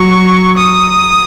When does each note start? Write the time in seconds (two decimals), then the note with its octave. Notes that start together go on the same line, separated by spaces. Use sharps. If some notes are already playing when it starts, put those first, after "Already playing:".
Already playing: F#3 C#6
0.57 D#6